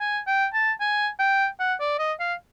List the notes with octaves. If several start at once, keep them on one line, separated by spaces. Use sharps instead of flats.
G#5
G5
A5
G#5
G5
F#5
D5
D#5
F5